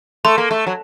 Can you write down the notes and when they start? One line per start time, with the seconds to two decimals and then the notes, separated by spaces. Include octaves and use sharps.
0.25 A3 C6
0.38 A#3
0.51 A3
0.67 F#3